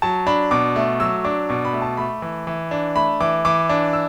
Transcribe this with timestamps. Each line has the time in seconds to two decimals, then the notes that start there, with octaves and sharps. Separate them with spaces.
0.02 F#3 A5
0.27 D4 B5
0.51 B2 D6
0.76 A3
1.00 F#3 E6
1.24 D4 D6
1.49 B2 D6
1.65 B5
1.73 A3
1.82 A5
1.97 A3 B5
2.22 E3
2.47 E3
2.71 D4
2.95 A3 B5
3.20 E3 D6
3.45 E3 D6
3.69 D4
3.93 E6